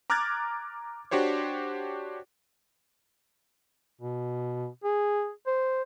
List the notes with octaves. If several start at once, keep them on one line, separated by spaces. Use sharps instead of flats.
A#5 D6 F6 F#6 G#6 A6
D4 F#4 G4 C5 C#5
B2
G#4
C5